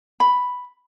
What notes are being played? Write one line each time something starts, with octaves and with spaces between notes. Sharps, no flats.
B5